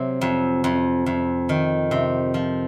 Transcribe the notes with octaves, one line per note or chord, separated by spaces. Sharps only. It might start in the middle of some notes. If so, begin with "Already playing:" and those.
Already playing: C3 F#3
F2
F2
F2
D#3
C3
F3